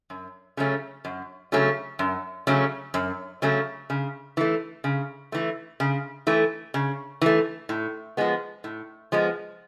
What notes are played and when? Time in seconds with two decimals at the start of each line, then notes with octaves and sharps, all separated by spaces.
0.10 F#2
0.57 C#3 F#3 A3 C#4
1.05 F#2
1.52 C#3 F#3 A3 C#4
1.99 F#2
2.47 C#3 F#3 A3 C#4
2.94 F#2
3.42 C#3 F#3 A3 C#4
3.90 C#3
4.37 E3 A3
4.84 C#3
5.32 E3 A3
5.80 C#3
6.27 E3 A3
6.74 C#3
7.21 E3 A3
7.69 A2
8.17 F3 G#3 B3
8.64 A2
9.12 F3 G#3 B3